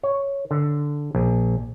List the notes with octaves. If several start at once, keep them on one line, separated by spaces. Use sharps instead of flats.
C#5
D3
A#1